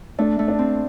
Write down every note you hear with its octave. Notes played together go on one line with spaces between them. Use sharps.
A3 D4
A3
D4
C4